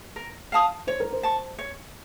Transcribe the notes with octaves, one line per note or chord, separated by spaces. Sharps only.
A#4
F5 A5 D#6
C5 C#5
A#4
C5
A5 C#6
C#5